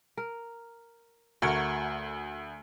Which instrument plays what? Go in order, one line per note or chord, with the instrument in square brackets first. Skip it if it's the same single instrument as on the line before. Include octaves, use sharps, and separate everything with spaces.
[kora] A#4
[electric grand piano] D2 G#6 C#7 [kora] A3 F#4 A#4